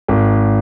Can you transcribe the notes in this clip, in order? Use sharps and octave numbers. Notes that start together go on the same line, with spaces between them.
G#1